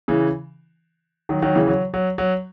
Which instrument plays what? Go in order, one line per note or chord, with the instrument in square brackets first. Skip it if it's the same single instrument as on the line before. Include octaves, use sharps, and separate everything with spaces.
[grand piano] C#3 E3
D#3 F#3
D#3 F#3
C#3 E3
F#3
F#3
F#3